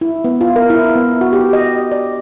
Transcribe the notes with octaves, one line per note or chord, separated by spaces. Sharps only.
E4
B3
F4
A#4
E4
B3
F#4
G4
D#5
D5